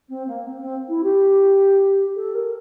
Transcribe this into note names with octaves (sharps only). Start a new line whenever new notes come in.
C4
A#3
C4
C4
E4
G4
A4
A#4